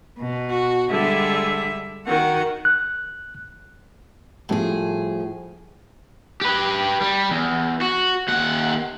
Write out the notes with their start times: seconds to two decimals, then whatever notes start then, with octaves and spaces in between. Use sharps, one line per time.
0.19 B2
0.50 F#4
0.90 D3 G3 G#3 E5
2.07 D#3 F#4 F#5
2.65 F#6
4.49 A2 F3 G3 E4 G#4
6.41 G4 B4
7.01 G3
7.30 E2
7.81 F#4
8.29 D#2 F#5